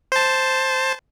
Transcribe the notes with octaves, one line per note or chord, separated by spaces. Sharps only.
C5 A5